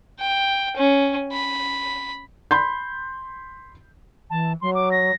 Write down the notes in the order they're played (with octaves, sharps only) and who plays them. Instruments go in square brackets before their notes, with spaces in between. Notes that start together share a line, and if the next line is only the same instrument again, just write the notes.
[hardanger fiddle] G5
C#4
B5
[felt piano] B5 C6 G6
[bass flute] E3 [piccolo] A5
[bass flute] F#3 [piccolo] C6
[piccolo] D6
A#6